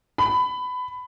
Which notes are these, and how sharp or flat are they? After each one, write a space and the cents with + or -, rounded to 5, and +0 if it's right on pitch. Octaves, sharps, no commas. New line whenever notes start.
B5 +20